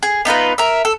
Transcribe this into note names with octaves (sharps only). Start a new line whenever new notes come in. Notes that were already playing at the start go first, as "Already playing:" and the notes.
G#4
B3 D#4 F4 B4
A#4 E5
A4